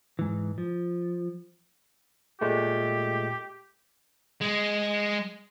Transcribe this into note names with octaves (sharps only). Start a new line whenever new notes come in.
G#2 E3
F3
A#2 G#3 A3 G4
G#3